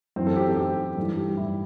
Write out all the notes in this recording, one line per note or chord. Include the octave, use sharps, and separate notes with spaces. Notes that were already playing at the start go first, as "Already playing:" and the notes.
F#2 E3 C4
A4
G4
A4
F#2 E3 G4
G2 E3 A4
G4
G2 E3 E4